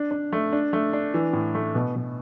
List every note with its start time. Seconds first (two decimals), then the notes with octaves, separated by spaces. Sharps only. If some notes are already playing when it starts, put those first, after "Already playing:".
Already playing: D4
0.11 D4
0.33 A3
0.53 D4
0.73 A3
0.93 D4
1.14 E3
1.33 A2
1.55 A3
1.75 B2
1.95 B2